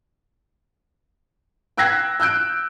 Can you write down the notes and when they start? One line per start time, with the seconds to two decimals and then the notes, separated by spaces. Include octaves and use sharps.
1.77 G5 E6 F#6 G#6 A#6 C7
2.20 E6 F#6 G6 D7